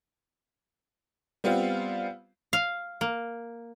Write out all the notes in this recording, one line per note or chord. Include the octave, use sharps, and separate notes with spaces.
G3 B3 C4 F4
F5
A#3